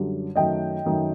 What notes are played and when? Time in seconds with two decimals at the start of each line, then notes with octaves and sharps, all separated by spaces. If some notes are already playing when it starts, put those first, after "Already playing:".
Already playing: F#2 D3 G3
0.35 F#2 D#3 A3 D#5 G5
0.85 F#2 D#3 A3